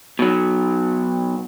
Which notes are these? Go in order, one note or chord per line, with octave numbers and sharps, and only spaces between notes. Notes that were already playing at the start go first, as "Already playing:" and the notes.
B2 F#3